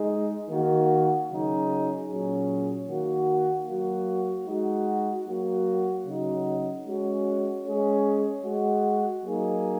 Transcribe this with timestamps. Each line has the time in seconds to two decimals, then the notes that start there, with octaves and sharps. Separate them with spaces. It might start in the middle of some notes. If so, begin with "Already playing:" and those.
Already playing: G#3 D#4 G#4
0.50 D#3 A#3 F#4
1.29 C#3 F#3 D#4 G#4
2.09 A#2 F#3 C#4 G#4
2.88 D#3 A#3 F#4
3.68 F#3 A#3 F#4
4.47 G#3 D#4 F#4
5.26 F#3 A#3 F#4
6.06 C#3 F#3 D#4 F#4
6.85 G#3 C#4 F#4
7.65 G#3 C#4 G#4
8.44 G#3 F#4
9.24 F#3 A#3 D#4 G#4